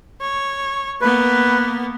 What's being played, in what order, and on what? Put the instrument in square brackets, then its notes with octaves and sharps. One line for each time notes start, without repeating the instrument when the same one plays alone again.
[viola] C#5
[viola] A#3 B3 [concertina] B4